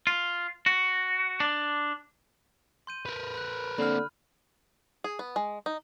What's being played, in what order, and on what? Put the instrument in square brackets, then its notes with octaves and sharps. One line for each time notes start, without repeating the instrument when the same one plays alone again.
[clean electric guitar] F4
F#4
D4
[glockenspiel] C6 G6 D#7
[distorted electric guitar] A#4 B4
[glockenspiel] B5 F#6
[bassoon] D3 [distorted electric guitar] A#3 C4 [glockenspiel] B5 F6
[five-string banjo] G#4
B3
G#3
D#4